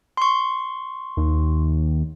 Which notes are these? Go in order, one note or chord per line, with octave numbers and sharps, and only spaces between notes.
C6 C#6
D#2